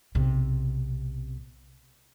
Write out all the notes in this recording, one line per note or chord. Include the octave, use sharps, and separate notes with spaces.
B1 C3